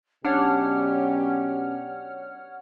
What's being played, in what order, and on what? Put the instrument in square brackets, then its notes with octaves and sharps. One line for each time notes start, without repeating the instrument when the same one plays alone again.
[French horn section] B2 F#3 G4 [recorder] C#4 [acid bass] D4 [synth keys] C#5 F#5 F6